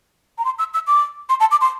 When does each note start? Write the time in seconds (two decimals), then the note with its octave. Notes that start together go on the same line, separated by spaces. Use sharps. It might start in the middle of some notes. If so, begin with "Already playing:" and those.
0.38 A#5
0.45 C6
0.59 E6
0.74 E6
0.87 D6
1.29 C6
1.40 A5
1.51 D6
1.61 C6